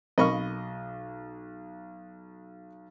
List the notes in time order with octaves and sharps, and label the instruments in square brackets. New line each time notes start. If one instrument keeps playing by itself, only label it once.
[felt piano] B1 [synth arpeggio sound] C4 A#4 F5 [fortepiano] D#5 B5 C#6